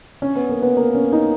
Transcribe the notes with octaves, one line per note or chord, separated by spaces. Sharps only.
C#4
B3
A#3
B3
A#3
C#4
D#4